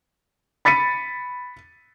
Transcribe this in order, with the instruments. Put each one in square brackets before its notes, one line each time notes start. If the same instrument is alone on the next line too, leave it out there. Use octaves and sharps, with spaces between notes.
[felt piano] B5 A6 B6 C#7 D#7